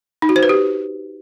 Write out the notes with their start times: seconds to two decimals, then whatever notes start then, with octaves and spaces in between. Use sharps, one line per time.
0.22 D#4
0.29 F#4
0.36 C5
0.43 B4
0.49 G4